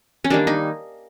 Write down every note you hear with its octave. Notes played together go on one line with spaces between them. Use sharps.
C#4
D#3 G3 A#3 D4
D#4